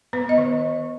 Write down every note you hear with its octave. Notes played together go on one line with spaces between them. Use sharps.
B3 B4
D#5
D#3